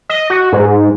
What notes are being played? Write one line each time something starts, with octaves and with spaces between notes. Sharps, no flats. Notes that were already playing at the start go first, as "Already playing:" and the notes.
D#5
F#4
G#2